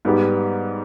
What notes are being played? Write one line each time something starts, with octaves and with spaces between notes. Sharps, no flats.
G#2 G3 B3 G4